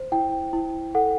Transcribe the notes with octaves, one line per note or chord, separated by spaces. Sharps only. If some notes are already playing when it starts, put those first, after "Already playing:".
Already playing: C5
E4 G5
E4
A4 F#5